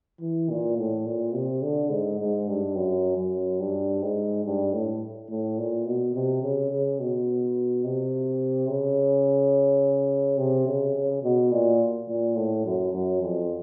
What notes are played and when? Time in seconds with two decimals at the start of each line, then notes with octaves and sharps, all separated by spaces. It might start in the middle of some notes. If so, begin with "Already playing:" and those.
0.21 E3
0.50 A#2
0.78 A2
1.06 A#2
1.34 C3
1.63 D3
1.91 G#2
2.19 G#2
2.48 G2
2.75 F#2
3.17 F#2
3.60 G2
4.02 G#2
4.45 G2
4.73 A2
5.29 A2
5.58 A#2
5.86 B2
6.14 C3
6.42 C#3
6.71 C#3
6.99 B2
7.84 C3
8.69 C#3
10.38 C3
10.67 C#3
10.95 C#3
11.23 B2
11.51 A#2
12.08 A#2
12.35 A2
12.65 F#2
12.92 F#2
13.21 F2